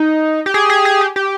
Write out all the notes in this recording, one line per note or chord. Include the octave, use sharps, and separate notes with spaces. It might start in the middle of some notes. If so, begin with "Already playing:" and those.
Already playing: D#4
G4
G#4
G#4
G#4
G4
G4